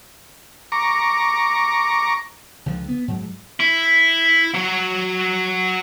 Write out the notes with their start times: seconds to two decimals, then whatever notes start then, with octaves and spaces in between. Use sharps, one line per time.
0.72 A#5 C#6 D6
2.66 C#2 D3 F3
2.89 B3
3.08 G#2 F#3
3.60 E4
4.55 F#3 C#5